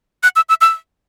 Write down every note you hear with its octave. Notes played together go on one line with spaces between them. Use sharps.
F#6
E6
E6
E6